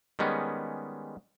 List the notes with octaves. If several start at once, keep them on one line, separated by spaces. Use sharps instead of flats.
D#3 G3 G#3 B3 C#4